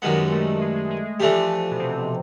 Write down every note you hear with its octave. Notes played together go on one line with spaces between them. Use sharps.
F#2 D#3 G3 G#3 B3
A3
G#3
G#3
G#3
G#3
E3 F3 A3 D4 G4
B2
C3